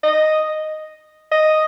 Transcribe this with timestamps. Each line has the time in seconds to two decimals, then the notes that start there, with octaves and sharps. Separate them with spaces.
0.03 D#5
1.31 D#5